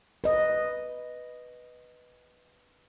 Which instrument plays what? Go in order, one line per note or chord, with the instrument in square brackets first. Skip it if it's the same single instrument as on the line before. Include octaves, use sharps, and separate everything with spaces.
[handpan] B4 D#5